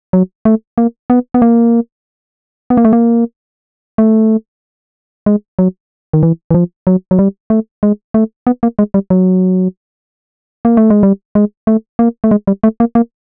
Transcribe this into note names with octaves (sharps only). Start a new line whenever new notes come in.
F#3
A3
A#3
B3
B3
A#3
B3
A#3
A3
A#3
A3
G#3
F#3
D#3
E3
E3
F3
F#3
F#3
G3
A3
G#3
A3
B3
A#3
G#3
G3
F#3
A#3
A3
G#3
G3
G#3
A3
A#3
A3
G#3
G3
A3
A#3
A#3